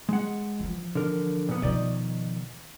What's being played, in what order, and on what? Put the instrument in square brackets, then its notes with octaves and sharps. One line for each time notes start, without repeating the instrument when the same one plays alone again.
[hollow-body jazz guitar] G#3 F#5
[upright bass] E3 F3
[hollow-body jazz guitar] D3 A#4
A#2 B3
[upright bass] B2 F3 [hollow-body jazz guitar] D#3 D5 D#5